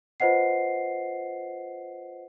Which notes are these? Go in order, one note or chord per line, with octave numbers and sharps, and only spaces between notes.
F4 B4 C5 D#5 F#5 C7